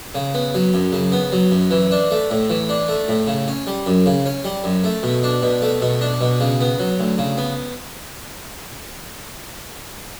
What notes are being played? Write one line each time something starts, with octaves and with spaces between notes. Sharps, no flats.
C#3
B3
F#3
F#2
C#3
B3
F#3
F#2
E3
D4
A3
A2
E3
D4
A3
A2
C#3
C#4
G3
F#2
C#3
C#4
G3
F#2
A3
B2
D4
B2
A3
B2
D4
B2
C#3
B3
F#3
D2
C#3
B3